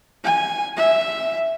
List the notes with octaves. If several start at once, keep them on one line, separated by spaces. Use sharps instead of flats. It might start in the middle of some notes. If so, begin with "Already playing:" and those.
G#5
E5